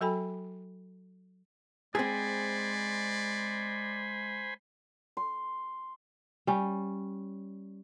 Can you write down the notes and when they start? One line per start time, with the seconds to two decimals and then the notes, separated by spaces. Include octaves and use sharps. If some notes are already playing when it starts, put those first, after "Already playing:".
0.01 F#3 F#4 A4 G5 G#5 B5
1.95 G#3 C4 G#4 C5 D5 G#5 B5
5.17 C6
6.47 G3 C#4